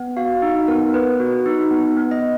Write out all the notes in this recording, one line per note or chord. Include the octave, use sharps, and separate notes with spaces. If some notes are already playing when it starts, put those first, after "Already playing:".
Already playing: B3
F#4 F5
D#4
B3 A#4
B3 B4
F#4
D#4
B3
B3
D#5